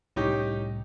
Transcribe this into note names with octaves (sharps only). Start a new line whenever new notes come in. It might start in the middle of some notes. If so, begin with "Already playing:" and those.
C2 A2 C#4 D#4 G4